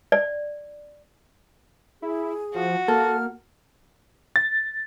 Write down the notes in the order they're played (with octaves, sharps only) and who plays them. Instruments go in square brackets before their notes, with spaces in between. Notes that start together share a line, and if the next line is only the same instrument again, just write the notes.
[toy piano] D5
[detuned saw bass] E4 [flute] G#4
[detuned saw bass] F3 [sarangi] F#4
[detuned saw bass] A#3 [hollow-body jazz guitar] A4 [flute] F6
[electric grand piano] A6